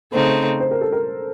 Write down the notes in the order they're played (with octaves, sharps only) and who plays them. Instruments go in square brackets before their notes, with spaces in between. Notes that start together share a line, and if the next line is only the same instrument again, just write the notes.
[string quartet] C#3 A3 C4 D#4 [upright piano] C5
[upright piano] C5
A#4
A4
A#4